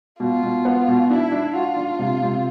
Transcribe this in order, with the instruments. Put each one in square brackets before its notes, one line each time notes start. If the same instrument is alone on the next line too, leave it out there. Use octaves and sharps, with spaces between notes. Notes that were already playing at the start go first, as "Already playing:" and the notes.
[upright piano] B2 [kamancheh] F4
[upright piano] B2
B3
B2
[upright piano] D4 [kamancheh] E4
[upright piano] D4
[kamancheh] F4 [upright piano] F#4
[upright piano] D4
C3
C3